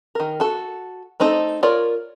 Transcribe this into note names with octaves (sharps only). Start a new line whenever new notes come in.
D#3 A#4
F#4 A4
A3 C4 D#4 A4
F4 A#4 C#5 D5